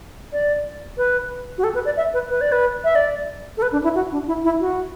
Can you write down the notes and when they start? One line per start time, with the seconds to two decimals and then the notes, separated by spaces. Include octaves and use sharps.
0.33 D5
0.97 B4
1.58 F#4
1.64 A4
1.75 B4
1.85 D5
1.97 E5
2.14 B4
2.29 B4
2.41 D5
2.52 B4
2.84 E5
2.95 D5
3.57 A4
3.62 B4
3.72 D4
3.84 E4
3.95 F#4
4.12 D4
4.27 E4
4.44 E4
4.60 F#4